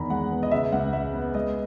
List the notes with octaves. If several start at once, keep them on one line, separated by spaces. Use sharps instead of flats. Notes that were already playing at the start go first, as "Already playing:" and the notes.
Already playing: E2 D#3 A#5 B5
G#3 F#5
B3
D#5
C#3 E5
C#2 F#5
G#3 E5
B3
G#3 D#5